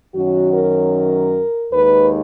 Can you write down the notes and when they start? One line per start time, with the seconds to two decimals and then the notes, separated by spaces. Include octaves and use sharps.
0.14 F#2 D#3 F#3 C#4 F#4
0.54 A#4
1.72 D#2 D#3 G#3 B4